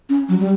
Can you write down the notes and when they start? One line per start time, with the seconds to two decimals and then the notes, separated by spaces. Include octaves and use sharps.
0.09 C#4
0.29 F#3
0.39 G3